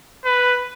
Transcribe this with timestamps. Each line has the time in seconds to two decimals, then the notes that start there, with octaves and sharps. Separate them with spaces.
0.25 B4